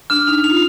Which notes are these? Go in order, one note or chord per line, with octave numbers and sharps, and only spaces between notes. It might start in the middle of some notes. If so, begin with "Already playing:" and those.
D4 F6
D#4 F7
D#4
F7
F4